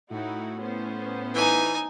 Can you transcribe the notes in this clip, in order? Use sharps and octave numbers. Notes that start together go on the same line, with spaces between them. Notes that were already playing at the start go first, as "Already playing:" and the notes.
A2 D#4 E4 F#4
B3 C#4 C5
E3 D#4 G#5